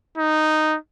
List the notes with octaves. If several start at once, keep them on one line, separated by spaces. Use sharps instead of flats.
D#4